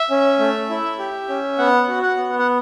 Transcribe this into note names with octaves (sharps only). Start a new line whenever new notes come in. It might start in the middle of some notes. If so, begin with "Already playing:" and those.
Already playing: E5
C#4
A3
E4
G4
C#4
B3 F#5
F#4
F#5
B3
F#5